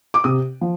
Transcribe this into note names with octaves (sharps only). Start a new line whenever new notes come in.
D6
C3 D#6
F3